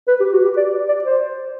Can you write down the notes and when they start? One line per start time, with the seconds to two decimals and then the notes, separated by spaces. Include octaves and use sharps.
0.08 B4
0.20 G4
0.33 F#4
0.45 G4
0.57 D5
0.89 D5
1.04 C5